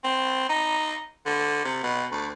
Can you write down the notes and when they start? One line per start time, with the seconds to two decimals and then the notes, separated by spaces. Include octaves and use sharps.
0.04 C4
0.49 D#4
1.26 D3
1.65 C3
1.83 B2
2.12 D2